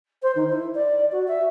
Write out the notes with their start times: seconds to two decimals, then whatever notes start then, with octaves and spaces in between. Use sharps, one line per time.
0.22 C5
0.35 D#3
0.49 E4
0.74 D5
1.11 F#4
1.28 E5